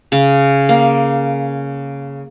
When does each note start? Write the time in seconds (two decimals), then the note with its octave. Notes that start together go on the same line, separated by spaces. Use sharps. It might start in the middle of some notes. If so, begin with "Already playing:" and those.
0.12 C#3
0.69 A#3